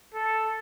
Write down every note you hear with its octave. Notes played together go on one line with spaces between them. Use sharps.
A4